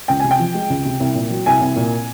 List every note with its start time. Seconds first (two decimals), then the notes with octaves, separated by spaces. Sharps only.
0.08 C#2 G5
0.20 C3 G#5
0.31 G5
0.39 F3
0.55 G#3
0.70 C#2
0.85 C3
1.00 C2
1.15 A#2
1.30 F#3
1.46 C2 G#5
1.61 C2
1.76 A#2